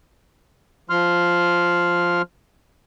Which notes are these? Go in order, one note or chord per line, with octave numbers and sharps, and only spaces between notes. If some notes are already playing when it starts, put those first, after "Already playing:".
F3 C6 F6